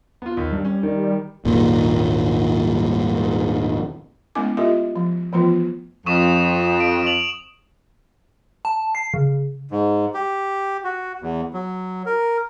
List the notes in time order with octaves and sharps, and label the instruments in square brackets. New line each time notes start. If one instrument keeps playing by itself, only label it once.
[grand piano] B3 F4
D#2
[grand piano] G2 [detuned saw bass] G3
[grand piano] C#4
D#3
[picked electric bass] G#1 D#2 A#2
[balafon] G#3 A3 B3 C#4 E4 D6
F4 G4 A4 D#5 E5
F3
E3 F3 A3 B3 F4
[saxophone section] F2 [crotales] C#6 D#6 E7
[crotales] D7
F7 F#7
[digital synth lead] A5
C7
C#3
[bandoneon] G#2
G4
F#4
E2
F#3
A#4